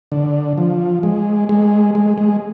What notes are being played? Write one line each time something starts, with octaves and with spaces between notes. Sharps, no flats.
D3
F3
G#3
G#3
G#3
G#3